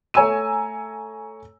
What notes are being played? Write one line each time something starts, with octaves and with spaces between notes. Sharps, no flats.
A3 C#5 G#5 A#5 E6 D#7